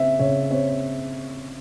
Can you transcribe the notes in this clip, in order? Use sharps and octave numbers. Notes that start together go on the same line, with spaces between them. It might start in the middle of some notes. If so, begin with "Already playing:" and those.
Already playing: C#3 C4 E5
C#3 C#5
C4 C#5